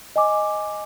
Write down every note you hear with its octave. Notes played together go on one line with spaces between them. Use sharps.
D#5 G#5 D6